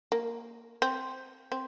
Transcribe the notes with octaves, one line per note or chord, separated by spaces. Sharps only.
A#3
C4
C4